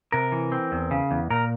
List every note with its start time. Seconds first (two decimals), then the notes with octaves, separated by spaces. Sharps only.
0.12 C3 A#4
0.32 E3
0.52 C4
0.72 E2
0.91 C#3
1.11 E2
1.30 A#2 A#4